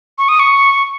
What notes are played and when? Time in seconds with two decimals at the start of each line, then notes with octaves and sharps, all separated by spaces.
0.18 C#6
0.29 D#6
0.39 C#6